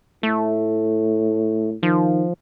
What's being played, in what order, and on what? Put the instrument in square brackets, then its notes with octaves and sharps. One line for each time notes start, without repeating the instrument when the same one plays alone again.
[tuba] A2 [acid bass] A3
[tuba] D#3 [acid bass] F3